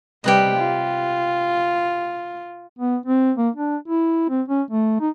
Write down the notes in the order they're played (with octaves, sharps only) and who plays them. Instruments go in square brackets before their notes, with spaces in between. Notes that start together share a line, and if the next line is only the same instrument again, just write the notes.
[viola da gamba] C3 G3 [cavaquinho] G4 B4 D#5
[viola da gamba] F4
[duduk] B3
C4
A#3
D4
E4
C4
C#4
A3
D#4